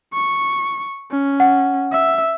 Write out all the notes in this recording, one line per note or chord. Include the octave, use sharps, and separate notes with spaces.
C#6
C#4
F#5
E5